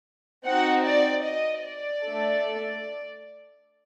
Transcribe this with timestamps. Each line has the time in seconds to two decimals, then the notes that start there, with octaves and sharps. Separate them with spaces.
0.46 C4 D#4 F#4 F#5
0.85 D5
1.25 D#5
1.64 D5
2.03 A3 D4 A4